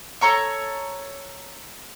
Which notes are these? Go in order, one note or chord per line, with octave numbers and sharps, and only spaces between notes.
A4 C#5 A#5 C#6